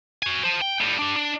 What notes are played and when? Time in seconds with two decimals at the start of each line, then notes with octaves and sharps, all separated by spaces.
0.23 F#4 G#5
0.44 C5 A5
0.61 G5
0.81 A2 G3
0.98 D4 G4
1.16 D4